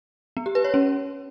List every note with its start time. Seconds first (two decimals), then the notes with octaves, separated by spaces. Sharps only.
0.37 B3
0.46 G4
0.55 B4
0.64 C#5
0.74 C#4